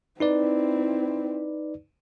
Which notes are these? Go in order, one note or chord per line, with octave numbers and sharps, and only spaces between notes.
C4 D#4 E4 B4 D5